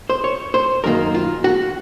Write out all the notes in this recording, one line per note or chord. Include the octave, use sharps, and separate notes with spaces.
C5
C#5
C5
F#2 D#3 A#3 A#4
F4
F#4